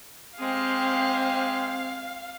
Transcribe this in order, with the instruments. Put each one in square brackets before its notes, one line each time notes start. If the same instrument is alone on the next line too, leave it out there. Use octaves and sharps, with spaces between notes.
[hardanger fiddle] G#3 G4 [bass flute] C4 [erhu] F5